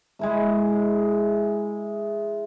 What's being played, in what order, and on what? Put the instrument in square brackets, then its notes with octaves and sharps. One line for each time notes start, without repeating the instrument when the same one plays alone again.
[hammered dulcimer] G#3 E4 E5